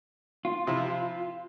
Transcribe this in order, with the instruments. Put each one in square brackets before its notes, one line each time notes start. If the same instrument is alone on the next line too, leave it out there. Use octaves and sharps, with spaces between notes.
[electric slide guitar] F4
[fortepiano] C3 F3 E4